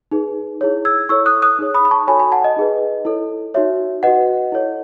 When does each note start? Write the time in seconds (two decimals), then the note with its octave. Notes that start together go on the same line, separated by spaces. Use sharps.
0.12 D#4 G#4 B4
0.61 E4 G#4 C#5
0.85 E6 G#6
1.09 E4 A4 C#5 C#6 E6
1.26 D#6 F#6
1.42 D#6 F#6
1.59 D#4 G#4 C#5
1.74 B5 D#6
1.85 B5
1.91 A5 C#6
2.07 F#4 A4 C#5 G#5 B5
2.19 G#5 B5
2.32 F#5 A5
2.44 D#5
2.56 D#4 G#4 B4
3.05 E4 A4 C#5
3.54 D#4 F#4 C#5 E5
4.03 F#4 B4 D#5 F#5
4.52 E4 A4 C#5